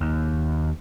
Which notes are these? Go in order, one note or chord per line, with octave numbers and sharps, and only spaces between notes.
D#2